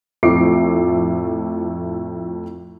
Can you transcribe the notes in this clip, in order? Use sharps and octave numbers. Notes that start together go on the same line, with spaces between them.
F2 A2 F3 A3 D6 C7